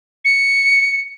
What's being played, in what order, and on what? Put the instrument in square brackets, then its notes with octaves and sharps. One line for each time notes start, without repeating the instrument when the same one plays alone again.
[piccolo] C#7